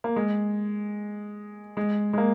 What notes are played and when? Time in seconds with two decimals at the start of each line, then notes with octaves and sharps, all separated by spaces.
0.04 A#3
0.16 G#3
1.77 G#3
2.13 G#3
2.18 A#3